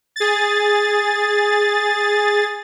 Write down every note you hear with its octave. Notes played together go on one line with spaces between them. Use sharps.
G#4 A6